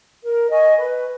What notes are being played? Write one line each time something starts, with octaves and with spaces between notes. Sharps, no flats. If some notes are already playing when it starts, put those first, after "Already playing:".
A#4
D#5 G#5 C#6
B4